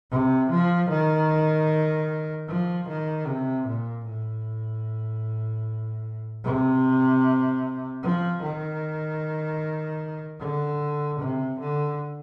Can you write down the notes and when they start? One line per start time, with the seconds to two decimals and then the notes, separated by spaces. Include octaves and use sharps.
0.11 C3
0.50 F3
0.89 D#3
2.48 F3
2.88 D#3
3.27 C3
3.67 A#2
4.06 A2
6.44 C3
8.03 F3
8.43 D#3
10.40 D3
11.20 C3
11.59 D3